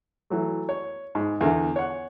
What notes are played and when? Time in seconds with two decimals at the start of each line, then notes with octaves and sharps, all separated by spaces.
0.30 E3 F#3 A3
0.69 C#5
1.15 G#2
1.41 E2 D3 A#4
1.76 C#5 F#5